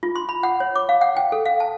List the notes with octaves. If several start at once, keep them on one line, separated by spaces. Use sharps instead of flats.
F4
C6
B5
F#5
C#5
D6
F5
F#5
G5
A4
F5
A5